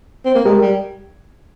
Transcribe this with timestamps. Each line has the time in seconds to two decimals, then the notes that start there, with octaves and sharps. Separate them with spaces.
0.25 C4
0.35 A#3
0.45 G#3 G4 A#4
0.61 G3